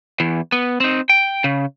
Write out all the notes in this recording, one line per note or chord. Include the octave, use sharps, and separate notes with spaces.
E2 E3
B3
C4 D#4
G5
C#3